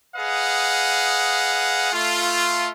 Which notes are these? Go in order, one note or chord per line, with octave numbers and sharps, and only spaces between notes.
G#4 B4 D#5 F5 F#5
A3 F4